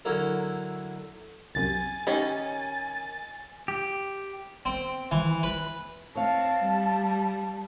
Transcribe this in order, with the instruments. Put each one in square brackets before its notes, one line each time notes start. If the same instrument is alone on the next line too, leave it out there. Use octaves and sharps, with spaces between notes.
[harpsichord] D3 F#3 E4 A#4
[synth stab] C2 F#2 C3 [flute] G#5 [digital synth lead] A6
[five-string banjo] D#3 C#4 [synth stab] G4
[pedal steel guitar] G4
[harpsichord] C4
E3
B4
[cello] C4 [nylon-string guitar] C#5 F5 [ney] A5
[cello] G3